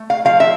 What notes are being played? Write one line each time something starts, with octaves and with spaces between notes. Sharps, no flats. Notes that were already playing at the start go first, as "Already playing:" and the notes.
Already playing: A3
F5
F3 F5
E5